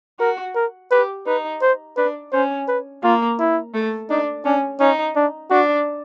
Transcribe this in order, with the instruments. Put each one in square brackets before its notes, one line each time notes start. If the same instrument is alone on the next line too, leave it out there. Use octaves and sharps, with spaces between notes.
[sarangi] F#4 [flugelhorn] A#4
[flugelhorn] A#4
[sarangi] G4 [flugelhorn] B4
[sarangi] D#4 [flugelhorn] B4
[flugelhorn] C5
[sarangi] D4 [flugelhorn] B4
[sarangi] C#4 [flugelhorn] C5
[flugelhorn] B4
[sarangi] A#3 [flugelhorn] F4
[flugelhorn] E4
[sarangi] A3
[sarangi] D4 [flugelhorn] D#4
[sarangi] C#4 [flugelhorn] D4
[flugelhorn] C#4 [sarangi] D#4
[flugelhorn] D4
[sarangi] D4 [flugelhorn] F#4